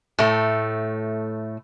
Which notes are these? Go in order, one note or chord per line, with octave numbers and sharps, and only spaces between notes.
A2 A3